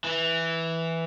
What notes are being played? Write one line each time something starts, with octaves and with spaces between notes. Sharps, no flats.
E3